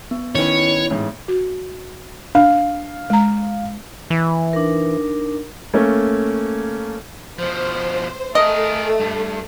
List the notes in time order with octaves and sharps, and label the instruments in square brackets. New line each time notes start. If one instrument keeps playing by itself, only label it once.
[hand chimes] B3
[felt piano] D#3 C#4 B4 [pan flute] E4 [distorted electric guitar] C#5
[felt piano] A1 G#2
[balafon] F#4
[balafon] D4 [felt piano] F5
[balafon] G#3 A#5
[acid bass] E3
[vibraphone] D4 D#4 A#4
[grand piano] A3 A#3 C#4
[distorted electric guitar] B2 F3 [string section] C5
[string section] A3 [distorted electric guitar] G#4 A#4 [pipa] D#5
[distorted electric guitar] G2